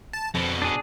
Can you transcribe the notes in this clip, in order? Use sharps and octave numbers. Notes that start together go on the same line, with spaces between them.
A5
F2 B2 D3
D4 G#4